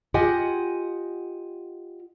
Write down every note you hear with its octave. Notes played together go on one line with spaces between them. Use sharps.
F4 G4 D#5 F#5 G#5